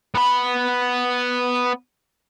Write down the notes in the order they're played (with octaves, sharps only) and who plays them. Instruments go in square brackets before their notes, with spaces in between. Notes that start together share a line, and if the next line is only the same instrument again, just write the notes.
[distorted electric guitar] B3 B5